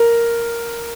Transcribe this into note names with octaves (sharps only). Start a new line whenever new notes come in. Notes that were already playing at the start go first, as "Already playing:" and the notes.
Already playing: A#4